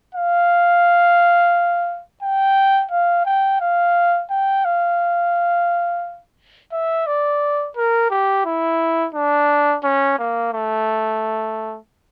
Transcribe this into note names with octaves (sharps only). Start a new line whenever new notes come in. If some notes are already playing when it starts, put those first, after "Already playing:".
F5
G5
F5
G5
F5
G5
F5
E5
D5
A#4
G4
E4
D4
C#4
A#3
A3